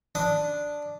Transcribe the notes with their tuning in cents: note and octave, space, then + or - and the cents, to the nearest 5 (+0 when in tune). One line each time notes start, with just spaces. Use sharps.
D4 +0 B5 +45 D#6 +0